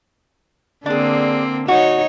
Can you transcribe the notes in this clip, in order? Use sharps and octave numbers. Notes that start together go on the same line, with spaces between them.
D3 A#3 C4 D4 G#4
D#4 F#4 C#5